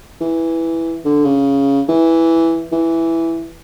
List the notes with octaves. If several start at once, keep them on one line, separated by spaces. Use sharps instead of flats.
E3
D3
C#3
E3
E3